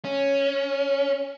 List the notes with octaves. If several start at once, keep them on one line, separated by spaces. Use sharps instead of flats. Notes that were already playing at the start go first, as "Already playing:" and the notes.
C#4